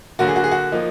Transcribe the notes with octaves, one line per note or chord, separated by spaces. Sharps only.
D3 F#3 A#3 F#4
G#4
F#4
G#4
F#4
F3 A#3 D#4